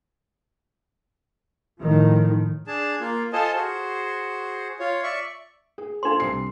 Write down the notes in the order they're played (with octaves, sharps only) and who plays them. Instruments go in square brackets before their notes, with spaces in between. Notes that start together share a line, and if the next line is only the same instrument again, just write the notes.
[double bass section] A2 D#3 F3
[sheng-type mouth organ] D4 G#4 A5
A#3 F4
F4 A4 C5 D#5 G#5 A5
F#4 G#4 C5
F4 C#5
D5 E5 C#6
[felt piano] G#4
[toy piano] D4 C6 [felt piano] F4 A4 C5
[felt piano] C2 C7